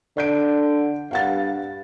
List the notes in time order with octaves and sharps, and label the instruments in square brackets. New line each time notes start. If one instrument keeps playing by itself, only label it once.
[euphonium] D3 [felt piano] D5 G6 D7
[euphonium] G2 [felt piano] F5 F#5 A6